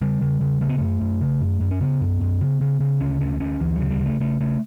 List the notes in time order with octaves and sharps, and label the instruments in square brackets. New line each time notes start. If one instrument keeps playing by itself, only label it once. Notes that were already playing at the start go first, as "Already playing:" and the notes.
[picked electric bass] C#3 G3
C#3
C#3
C#3 A3
B3
F#2 A3
F#2
C#3
F#2
F#2
C#4
C#3 B3
F#2
F#2
C#3
C#3
C#3
D2 C#4
D2 C#4
D2 C#4
D2 E3
F#3
C#3
G3
C#3 A3
C#3 A3
C#3 A3